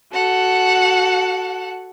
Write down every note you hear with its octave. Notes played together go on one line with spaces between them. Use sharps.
F#4 A4 F#5